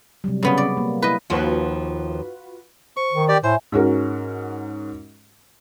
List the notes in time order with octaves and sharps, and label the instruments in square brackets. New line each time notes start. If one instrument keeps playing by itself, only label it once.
[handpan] C3 F#3 G3
[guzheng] C#3 B3 C#4
D5
[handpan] A#3
[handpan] E4 [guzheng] B4 D#5
[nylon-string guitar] D#2 F3 [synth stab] F4 F#4 B4
[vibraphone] C5 [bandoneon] C#6
[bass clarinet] D#3
[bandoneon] G4 D5
[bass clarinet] A2 [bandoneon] C5 [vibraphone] E5 G#5
[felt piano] G#2 C#4 F#4 A#4